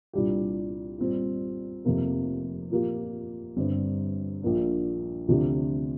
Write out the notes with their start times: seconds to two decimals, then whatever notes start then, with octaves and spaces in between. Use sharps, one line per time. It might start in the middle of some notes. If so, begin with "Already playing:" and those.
0.13 C2 A#2 G3 D4 G4
0.99 A#2 G3 C4
1.85 F1 F2 C3 A#3
2.70 A#2 F3 A#3 G4
3.56 G1 G2 G3 C4
4.43 A#1 A#2 A#3 D4
5.28 D2 C3 F3 D4 G4